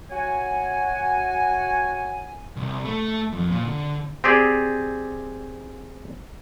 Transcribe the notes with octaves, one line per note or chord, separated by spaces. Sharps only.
F#4 C#5 G#5
C2
A3
F2
A#2
D3
C4 G4 G#4 D5